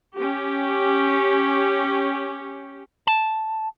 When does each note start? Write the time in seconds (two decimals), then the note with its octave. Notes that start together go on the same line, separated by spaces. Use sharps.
0.16 C#4 G4
3.07 A5